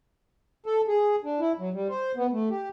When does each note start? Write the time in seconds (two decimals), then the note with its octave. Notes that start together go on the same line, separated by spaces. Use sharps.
0.66 A4
0.88 G#4
1.24 D4
1.40 E4
1.59 F#3
1.74 G3
1.89 C5
2.17 B3
2.33 A3
2.50 G4